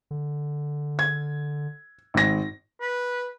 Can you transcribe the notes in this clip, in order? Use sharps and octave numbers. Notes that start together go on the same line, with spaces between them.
D3
G#6
G#1 A#6
B4